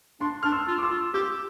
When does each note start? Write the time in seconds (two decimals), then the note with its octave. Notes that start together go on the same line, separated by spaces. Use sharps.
0.20 D4 A5 C6
0.43 D4 F6
0.52 C6 E6
0.68 F4
0.78 D6
0.82 C6 E6
0.91 F4
1.14 G4 E6 G6